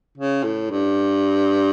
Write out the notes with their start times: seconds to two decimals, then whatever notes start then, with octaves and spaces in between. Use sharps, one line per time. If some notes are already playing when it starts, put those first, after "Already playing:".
0.18 C#3
0.44 A2
0.71 G2